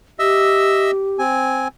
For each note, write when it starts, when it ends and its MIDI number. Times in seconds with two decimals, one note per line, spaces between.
0.19 1.22 67
0.19 0.91 75
0.19 0.91 76
0.19 0.91 88
1.19 1.68 60
1.19 1.68 80